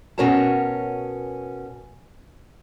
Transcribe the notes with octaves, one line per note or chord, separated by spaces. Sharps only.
B2 C#4 F#4 A#4 C#5 A5